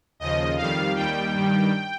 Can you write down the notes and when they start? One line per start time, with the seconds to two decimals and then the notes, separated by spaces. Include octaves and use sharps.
0.19 D#2 C#3 F3 D#5
0.57 F2 D#3 G3 F5
0.95 D#2 D#3 G3 G5
1.33 G2 D#3 G3